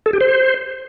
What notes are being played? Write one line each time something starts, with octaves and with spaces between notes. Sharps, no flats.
A4
G4
C5